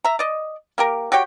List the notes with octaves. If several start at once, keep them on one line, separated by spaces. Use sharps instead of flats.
E5 A#5
D5 D#5
A#3 G4 A#4
F#4 G4 C#5 G5